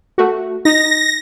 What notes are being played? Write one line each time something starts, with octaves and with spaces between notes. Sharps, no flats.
A3 F#4
D#4 A#6